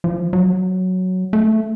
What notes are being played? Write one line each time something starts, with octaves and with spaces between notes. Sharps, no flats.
F3
F#3
A3